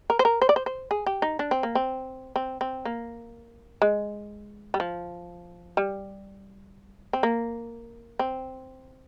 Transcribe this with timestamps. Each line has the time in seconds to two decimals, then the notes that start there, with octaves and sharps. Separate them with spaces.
0.10 A#4
0.19 C5
0.25 A#4
0.42 C5
0.49 D5
0.56 C5
0.66 C5
0.91 G#4
1.06 G4
1.22 D#4
1.39 D4
1.51 C4
1.63 A#3
1.75 C4
2.36 C4
2.61 C4
2.85 A#3
3.82 G#3
4.74 G3
4.80 F3
5.77 G3
7.13 C4
7.23 A#3
8.19 C4